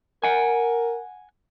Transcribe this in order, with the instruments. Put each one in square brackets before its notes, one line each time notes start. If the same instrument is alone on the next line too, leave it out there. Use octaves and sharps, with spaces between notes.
[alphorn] A#4 [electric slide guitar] F#5 G#5